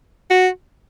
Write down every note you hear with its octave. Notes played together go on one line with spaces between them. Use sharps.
F#4